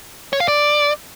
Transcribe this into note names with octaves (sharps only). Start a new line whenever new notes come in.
C#5
F5
D5